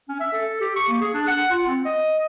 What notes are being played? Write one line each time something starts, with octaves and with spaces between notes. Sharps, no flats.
C#4
E5
A4
G4
C#6
A#3
G#4
D4
F#5
F4
C4
D#5